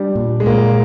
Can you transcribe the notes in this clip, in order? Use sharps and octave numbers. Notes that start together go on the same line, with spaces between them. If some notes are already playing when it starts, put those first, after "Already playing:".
Already playing: G3 D4
A#2
G#3
A#2 A#3